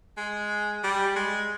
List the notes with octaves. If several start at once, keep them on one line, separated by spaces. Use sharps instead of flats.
G#3
G3
G#3